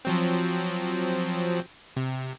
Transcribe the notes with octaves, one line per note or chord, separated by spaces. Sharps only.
F3 F#3 C4
C3